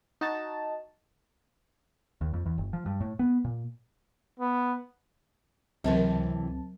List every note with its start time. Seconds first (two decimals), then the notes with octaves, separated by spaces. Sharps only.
0.21 D#4 F#4 A5
2.21 D#2
2.33 F2
2.46 E2
2.58 G1
2.73 F3
2.86 G2
3.01 A2
3.19 B3
3.45 A#2
4.40 B3
5.84 C#2 A2 C3 E3 F#3 C4 A#4 A5